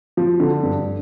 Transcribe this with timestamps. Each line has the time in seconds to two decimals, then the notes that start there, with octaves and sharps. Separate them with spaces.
0.17 F3
0.40 D3
0.63 G2